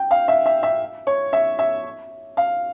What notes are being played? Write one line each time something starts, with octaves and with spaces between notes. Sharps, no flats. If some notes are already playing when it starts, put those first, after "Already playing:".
Already playing: G5
F5
E5
E5
E5
C#5
E5
E5
F5